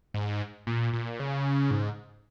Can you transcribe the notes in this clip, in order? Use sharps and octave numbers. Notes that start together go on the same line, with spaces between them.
G#2
A#2
A#2
C#3
G#2